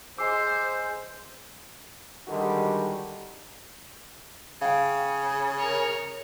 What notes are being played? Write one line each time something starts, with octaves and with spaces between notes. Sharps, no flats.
G#3 C5 D6 E6 C7
D3 D#3 G3 G#3 D#4 F#4
C#3 F5 G5
A#4 C#5